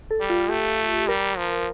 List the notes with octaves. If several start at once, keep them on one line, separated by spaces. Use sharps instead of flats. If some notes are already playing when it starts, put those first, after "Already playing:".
A4
G3
F4
A3 G4
G3 A#4
F3